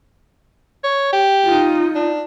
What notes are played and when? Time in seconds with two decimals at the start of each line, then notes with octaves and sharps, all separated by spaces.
0.84 C#5
1.13 G4
1.44 D#4 F4
1.95 D4